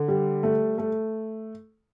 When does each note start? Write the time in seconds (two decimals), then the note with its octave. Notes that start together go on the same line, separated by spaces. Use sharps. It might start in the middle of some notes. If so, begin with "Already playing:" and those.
Already playing: D3
0.08 G3
0.43 A3
0.78 A3